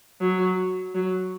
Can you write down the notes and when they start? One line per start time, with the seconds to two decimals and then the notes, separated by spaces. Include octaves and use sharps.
0.21 F#3
0.95 F#3